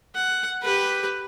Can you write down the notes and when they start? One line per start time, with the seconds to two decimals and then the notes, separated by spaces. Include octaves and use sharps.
0.15 F#5
0.62 G4 B4